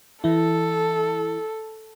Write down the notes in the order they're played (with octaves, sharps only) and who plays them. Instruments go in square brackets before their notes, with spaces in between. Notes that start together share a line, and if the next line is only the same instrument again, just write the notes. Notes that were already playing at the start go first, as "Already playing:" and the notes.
[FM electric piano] E3 E4 [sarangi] A4